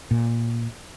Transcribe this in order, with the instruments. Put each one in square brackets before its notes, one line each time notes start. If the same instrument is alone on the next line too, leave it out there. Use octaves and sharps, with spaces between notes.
[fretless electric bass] A#2